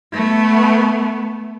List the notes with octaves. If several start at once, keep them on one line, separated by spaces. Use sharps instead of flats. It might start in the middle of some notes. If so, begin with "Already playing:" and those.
A3 B3